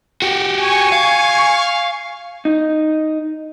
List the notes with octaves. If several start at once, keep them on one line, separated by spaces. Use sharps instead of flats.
F#4 G4
G#5 C#6
F5
D#4